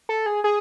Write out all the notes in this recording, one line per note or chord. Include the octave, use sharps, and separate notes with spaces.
A4
G#4
G#4